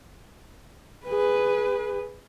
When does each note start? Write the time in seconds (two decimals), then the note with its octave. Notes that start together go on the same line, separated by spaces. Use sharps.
1.06 G#4 B4